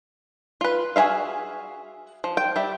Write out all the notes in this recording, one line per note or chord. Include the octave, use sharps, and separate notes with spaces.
F4 B4
F#4 G#4 A#4 E5 F5
F3
G5
G3 E5